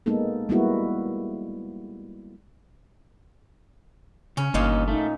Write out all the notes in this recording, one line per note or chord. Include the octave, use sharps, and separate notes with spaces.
G#3 A#3 B3 D#4 A4
G3 G#3 A#3 B3 E4 F#4
C#3 C#4
G1 A#2 A#3 D#4 C#5 D#5 F5
A3 D#4